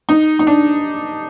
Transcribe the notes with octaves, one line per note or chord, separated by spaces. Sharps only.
D#4
D#4
D4